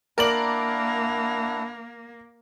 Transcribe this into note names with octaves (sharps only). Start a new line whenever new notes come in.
A#3 D4 E4 A#4 D5 F#5 F#7